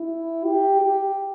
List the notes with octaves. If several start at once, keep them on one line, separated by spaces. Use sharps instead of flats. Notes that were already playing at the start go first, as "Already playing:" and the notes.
Already playing: E4
G4
G4